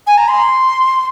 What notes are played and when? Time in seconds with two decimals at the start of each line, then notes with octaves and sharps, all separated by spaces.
0.07 G#5
0.18 A#5
0.28 C6